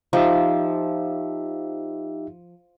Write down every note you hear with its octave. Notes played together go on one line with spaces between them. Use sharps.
F3 D#4 G4 E5